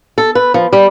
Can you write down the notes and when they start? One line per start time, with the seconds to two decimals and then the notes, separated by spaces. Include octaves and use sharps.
0.18 A4
0.35 B4
0.54 F3
0.73 G3